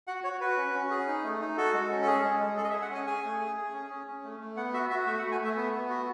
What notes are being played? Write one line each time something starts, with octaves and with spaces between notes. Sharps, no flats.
F#4 F#5
F#4 C#5
F#4 B4
C#4
C#4
G#4
D#4
A3
D#4
F#4 A4
G#3
C#4
A4
G#4
G#3
G#3
G#4 A4
D#5
E5
G#4
F#5
C#4 G#5
G#4 G#5
A3
G#4
G#4
C#4
C#4
C#4
A3
A3
B3 F#5
F#4 E5
F#4 E5
A3 E5
F#5
A3
G#5
A3 E5
B3
B3
F#4